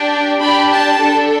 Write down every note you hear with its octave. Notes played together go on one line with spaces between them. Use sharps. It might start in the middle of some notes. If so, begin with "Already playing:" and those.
Already playing: D4 G4
D4 G4 B5
A5
D4 A4